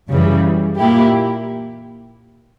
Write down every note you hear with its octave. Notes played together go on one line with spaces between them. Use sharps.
F#2 C#3 E3 G3
A#2 A#3 E4 G4